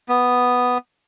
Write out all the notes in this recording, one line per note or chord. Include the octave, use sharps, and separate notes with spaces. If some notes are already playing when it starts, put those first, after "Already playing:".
B3